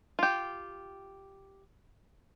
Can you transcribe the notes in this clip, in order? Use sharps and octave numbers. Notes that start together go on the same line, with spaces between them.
F4 G4